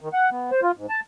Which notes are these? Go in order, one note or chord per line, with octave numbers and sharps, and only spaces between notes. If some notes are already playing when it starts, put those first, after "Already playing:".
D#3
F#5
B3
C5
F4
G#2
A5